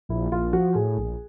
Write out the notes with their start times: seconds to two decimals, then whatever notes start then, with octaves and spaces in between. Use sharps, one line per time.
0.09 A#1 E4
0.32 A#1 F4
0.53 F3 F#4
0.75 A2 G#4
0.98 A#1